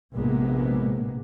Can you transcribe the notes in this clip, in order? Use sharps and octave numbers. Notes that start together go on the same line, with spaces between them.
A#1 A2 C3 G#3 A#3 B3